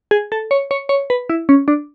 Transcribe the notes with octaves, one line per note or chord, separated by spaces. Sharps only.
G#4
A4
C#5
C#5
C#5
B4
E4
C#4
D4